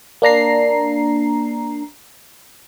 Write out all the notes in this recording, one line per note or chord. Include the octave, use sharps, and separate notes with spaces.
A#3 D4 A#5 C7